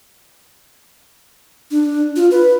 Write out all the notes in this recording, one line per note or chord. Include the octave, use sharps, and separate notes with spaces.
D4
F4
B4